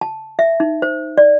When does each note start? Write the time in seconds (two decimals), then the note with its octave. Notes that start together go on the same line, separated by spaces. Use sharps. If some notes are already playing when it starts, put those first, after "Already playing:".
0.01 A5
0.39 E5
0.60 D#4
0.82 C5
1.18 D5